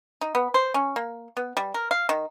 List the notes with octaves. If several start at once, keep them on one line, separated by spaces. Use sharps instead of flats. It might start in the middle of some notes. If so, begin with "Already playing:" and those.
D#4
B3
C5
C#4
A#3
B3
G3
A#4
F5
D#3